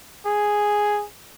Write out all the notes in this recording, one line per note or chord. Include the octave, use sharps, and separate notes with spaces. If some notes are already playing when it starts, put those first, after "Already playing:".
G#4